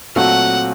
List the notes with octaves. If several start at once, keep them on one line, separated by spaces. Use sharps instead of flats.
A#2 F#3 A3 C4 F#4 F#5